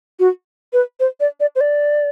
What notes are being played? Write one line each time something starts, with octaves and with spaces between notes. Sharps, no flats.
F#4
B4
C5
D5
D5
C5
D5